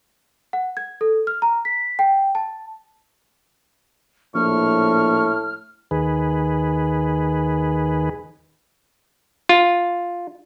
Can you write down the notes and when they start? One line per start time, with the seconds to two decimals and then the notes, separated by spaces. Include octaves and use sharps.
0.53 F#5
0.77 G#6
1.01 A4
1.27 F6
1.42 A#5
1.65 B6
1.99 G5
2.35 A5
4.35 A#1 A2 C#6 F6
5.91 D#2 D#3 G#4 B4
9.49 F4